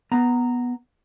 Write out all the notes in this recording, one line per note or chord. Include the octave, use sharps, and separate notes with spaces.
B3 A#5